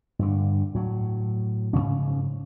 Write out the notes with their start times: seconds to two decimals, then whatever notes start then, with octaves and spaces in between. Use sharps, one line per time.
0.19 G2 D3
0.75 A2 F#3
1.73 G#2 C#3 C#4